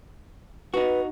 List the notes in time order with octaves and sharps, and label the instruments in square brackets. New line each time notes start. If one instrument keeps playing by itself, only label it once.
[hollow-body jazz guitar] D#4 F#4 [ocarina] B4